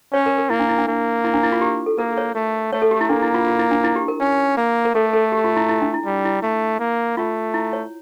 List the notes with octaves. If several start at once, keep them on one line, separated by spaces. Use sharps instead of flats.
C#4 C#5
A#4
A#4
A#3 E4
D4
E4
D4
A#3
E4
D4
E4
F4
G4
A4
A#3 A#4
C#5
A3
A3 C#5
A4
G4
E4
A#3 D4
E4
F4
F4
E4
D4
E4
G4
A#4
C#4
A#3
A#4
A3 A4
A4
G4
F4
E4
E4
D4
E4
G3
E4
A3
A#3
A3 F4
E4
C#5